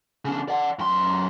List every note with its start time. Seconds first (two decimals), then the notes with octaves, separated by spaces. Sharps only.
0.25 C#3 D4
0.48 D5 F#5
0.79 F#2 C6